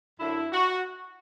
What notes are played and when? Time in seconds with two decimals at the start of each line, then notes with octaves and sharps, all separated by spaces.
0.20 F#2 D3 A3 E4
0.52 F#4